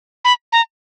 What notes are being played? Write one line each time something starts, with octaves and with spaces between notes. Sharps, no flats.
B5
A#5